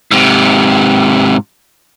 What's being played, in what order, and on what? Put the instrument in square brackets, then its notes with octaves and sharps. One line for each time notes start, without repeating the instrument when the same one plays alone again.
[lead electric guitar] G#2 C3